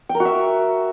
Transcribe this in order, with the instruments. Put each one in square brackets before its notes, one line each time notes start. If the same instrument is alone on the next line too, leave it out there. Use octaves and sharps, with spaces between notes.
[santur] G5
A#4
F#4
E5